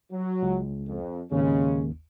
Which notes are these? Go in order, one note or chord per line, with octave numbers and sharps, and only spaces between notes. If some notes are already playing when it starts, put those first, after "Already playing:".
F#3
C#2
F2
G#1 D#2 C#3 G#3 C#4